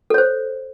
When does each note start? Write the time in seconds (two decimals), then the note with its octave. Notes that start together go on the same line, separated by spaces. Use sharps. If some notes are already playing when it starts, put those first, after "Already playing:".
0.10 A4
0.14 C#5
0.18 C5